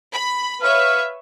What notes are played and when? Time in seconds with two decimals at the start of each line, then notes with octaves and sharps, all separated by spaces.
0.11 B5
0.62 B4 C#5 E5 F5